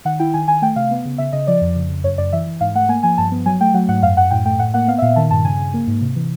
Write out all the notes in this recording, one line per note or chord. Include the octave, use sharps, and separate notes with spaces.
D#3 F#5
E4 G5
D#3 G#5
D#3 G#5
A3 G5
C3 F5
B3
C#3
C#3 E5
C#3 D#5
F3 D5
F2
C#3
C#3
F#2 C#5
F#2 D5
E3 E5
E3
G#2 F5
A3 F#5
A#3 G#5
F3 G#5
G2 A5
B3
F#3 G#5
A3 G5
F#3 F#5
G#2 F#5
F#2 F5
F#2 F#5
A2 G5
A3 G5
A2 F#5
A#3 F#5
B3 F5
E5
A#2 F5
D#3 A5
G2 A5
C#3 G#5
C#3
A#3
G#2
C3
E3